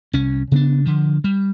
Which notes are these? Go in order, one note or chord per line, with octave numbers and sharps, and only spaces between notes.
C2 C#4
C#3 B3 D4
D3 F3
G3